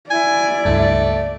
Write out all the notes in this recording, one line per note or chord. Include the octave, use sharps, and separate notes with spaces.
E4 D5 G#5
C#2 G2 A3